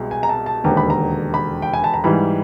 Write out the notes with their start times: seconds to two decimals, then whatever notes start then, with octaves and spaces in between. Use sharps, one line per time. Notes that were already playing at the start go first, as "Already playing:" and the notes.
Already playing: C2 B2 G#3
0.11 G#5
0.23 A#5
0.29 A5
0.46 A5
0.64 E1 D#2 D3 A#5
0.77 B5
0.90 A#5
1.34 B5
1.62 G5
1.74 G#5
1.84 A5
1.94 A#5
2.04 G#2 E3 G3 B5